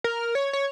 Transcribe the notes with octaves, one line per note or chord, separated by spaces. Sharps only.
A#4
C#5
C#5